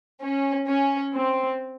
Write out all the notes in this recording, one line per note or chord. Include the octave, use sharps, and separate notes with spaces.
C#4
C#4
C4